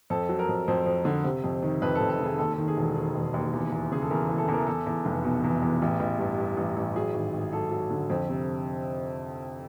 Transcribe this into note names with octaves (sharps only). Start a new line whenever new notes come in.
F2 A4
F#3
A#4
F2
F2 C5
F2
D3
C3
F2
D#3
F2 B4
A4
F2
A4
F1 G#4
D#2 A4
A4
D#3
G#4
E1 A4
D#3
E1
D#2
E2
E2
C#3 G#4
A4
E2 A#4
E3
A4
E2 A#4
E2 A4
E2
F1
B2
E2
E2
A1
A1
G2
G2
A1
A1
F#3 G#4
G#1
G#1
F#3 A4
F#3
D3
F2
C3